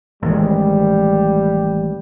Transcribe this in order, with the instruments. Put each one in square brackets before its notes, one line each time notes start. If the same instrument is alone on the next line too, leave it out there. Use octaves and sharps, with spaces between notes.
[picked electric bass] A1 D#3 G#3 [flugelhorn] G3